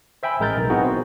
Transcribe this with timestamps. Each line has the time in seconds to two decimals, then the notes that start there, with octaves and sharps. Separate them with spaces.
0.23 C5 E5 G5 G#5 B5
0.40 A1 G#3 A#4 G6 A6
0.57 B1
0.70 B3 C4 D#4 E4 F#4 G#4
0.84 C5